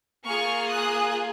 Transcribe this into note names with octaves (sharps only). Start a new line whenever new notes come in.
A#3 F4 G#4 C#6 F6
D#6 F#6